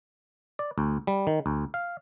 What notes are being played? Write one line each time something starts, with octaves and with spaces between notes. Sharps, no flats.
D5
D2
G3
D#3
D2
F5